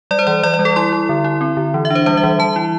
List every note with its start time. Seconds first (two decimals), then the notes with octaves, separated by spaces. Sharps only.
0.11 G3 D5
0.19 C5
0.27 E3 D5
0.43 G3 D5
0.54 D5
0.59 G3
0.65 A4
0.76 E4 C6
0.92 E4
1.09 D3
1.24 E4
1.41 C4
1.57 D3
1.74 E3
1.85 E5
1.90 D4 C5
2.06 G3 C5
2.17 E5
2.23 E3
2.39 E3 A5
2.56 E4